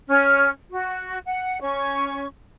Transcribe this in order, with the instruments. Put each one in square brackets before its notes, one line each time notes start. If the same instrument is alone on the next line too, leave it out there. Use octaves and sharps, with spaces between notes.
[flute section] C#4 F6
F#4
F#5
C#4 C#6